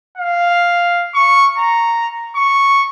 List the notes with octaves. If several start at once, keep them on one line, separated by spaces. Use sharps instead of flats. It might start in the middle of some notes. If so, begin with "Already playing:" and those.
F5
C#6
A#5
C#6